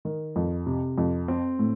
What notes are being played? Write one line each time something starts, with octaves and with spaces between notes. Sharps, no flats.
D#3
F2
C3
F2
C4
A2